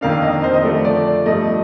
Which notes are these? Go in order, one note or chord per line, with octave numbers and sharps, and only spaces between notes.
F2 D#3 A#3 D4 F5
D#5
C5
D#5
D3 F3 A3 D4 D5
D5
D5
G2 F3 A3 D#5